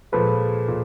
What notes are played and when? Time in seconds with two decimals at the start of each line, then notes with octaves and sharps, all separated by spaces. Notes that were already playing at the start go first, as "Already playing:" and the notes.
0.12 A#2 F3 G#3 A4 B4
0.68 A#2